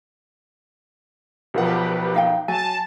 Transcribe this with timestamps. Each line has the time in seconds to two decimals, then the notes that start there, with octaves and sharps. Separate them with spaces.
1.54 B1 F3 G4 A#4 B4 F#5
2.14 D#4 F5 G5
2.48 F#3 G#5 A5